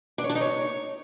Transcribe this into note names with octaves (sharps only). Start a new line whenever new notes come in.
D4
C#5
D4
D#4
C#5